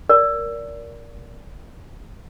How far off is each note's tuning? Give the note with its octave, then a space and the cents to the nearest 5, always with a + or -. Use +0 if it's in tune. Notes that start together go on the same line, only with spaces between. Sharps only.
A#4 +0 D5 -20